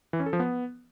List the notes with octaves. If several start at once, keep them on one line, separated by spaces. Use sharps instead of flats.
E3
C#4
A4
F3
B3